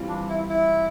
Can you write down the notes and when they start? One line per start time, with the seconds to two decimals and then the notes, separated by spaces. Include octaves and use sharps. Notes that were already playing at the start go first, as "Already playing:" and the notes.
Already playing: E3 G3 C4 F4
0.08 D4
0.29 E4
0.49 E4